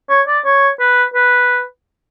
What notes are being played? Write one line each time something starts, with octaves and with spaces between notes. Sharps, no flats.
C#5
D5
C#5
B4
B4